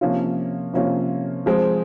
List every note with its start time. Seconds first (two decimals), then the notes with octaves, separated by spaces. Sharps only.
0.01 C3 F3 A#3 C#4 F4
0.74 C3 F3 A#3 C#4 F4
1.46 F3 G#3 C4